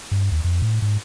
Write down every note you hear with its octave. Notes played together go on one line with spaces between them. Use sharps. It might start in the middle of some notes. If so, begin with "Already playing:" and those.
G2
D#2
F2
A2
G#2